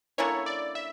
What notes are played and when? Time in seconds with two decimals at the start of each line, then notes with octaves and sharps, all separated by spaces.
0.18 D3 A#3 C#4 E4 C#5
0.46 D5
0.75 E5